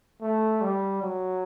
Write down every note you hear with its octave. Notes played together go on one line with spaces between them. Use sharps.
A3
G3
F#3